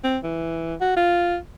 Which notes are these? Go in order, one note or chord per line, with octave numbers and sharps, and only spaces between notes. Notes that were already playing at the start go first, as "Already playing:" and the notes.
C4
E3
F#4
F4